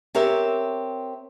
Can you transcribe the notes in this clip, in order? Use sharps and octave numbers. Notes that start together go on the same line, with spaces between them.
C4 G4 A#4 C#5 E5